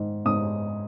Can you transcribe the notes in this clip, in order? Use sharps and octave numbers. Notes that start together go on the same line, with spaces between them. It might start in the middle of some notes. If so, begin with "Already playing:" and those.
Already playing: G#2 D#3
G#2 D#6